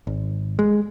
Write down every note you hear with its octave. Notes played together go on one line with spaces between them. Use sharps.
G#1
G#3